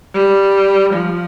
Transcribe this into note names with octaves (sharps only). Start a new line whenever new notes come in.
G3
F3